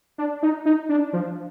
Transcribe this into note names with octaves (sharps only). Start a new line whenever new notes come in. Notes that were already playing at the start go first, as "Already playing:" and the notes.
D4
D#4
D#4
D4
F3